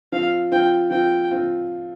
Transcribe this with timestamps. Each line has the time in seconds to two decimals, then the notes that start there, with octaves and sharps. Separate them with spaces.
0.12 F3 C4 F4 F5
0.52 F3 C4 F4 G5
0.91 F3 C4 F4 G5
1.31 F3 C4 F4